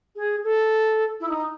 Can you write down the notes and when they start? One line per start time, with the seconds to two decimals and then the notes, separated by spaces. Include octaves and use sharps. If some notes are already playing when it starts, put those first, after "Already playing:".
0.16 G#4
0.44 A4
1.20 E4
1.29 D#4